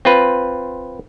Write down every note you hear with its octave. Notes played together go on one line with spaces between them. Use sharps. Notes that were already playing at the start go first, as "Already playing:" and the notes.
C4 F4 B4